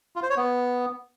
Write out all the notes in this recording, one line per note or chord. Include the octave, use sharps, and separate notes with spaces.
F4
C5
C#5
B3